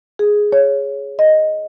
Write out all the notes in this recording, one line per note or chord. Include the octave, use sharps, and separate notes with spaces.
G#4
C#5
D#5